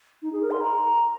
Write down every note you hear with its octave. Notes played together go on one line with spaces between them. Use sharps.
D#4
G#4
A#4
C6
A#5